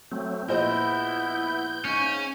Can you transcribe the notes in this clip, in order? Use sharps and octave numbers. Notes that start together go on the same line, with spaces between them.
F#3 A3 C4
A#1 B3 E4 C5 D#5 G6
G#2 C#3 C#4